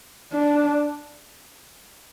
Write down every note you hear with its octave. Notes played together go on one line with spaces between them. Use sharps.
D4